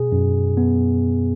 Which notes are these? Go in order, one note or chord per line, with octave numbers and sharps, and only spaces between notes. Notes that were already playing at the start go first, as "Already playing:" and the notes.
Already playing: B2 G#4
F#2
B3